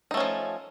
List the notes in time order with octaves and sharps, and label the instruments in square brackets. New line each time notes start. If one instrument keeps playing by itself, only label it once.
[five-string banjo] D#4
A3
C#4
F3